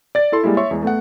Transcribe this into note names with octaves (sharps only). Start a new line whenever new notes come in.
D5 A6
E4 A4 C6
G3 G#3 A#3 E4
C#5 E5 C6 C#6
E2 G#3
A3 B3 F#5